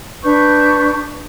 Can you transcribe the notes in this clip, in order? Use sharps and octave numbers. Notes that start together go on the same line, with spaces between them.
D4 B4 C#6 G6